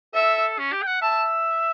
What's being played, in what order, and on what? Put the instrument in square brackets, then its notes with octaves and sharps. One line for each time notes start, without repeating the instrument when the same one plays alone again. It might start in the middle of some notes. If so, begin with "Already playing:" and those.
[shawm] A4 [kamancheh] E5
[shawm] C#4
G4
G5
F#5
[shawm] E5 [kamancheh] A5